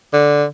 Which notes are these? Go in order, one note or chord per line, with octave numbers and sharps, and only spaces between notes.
D3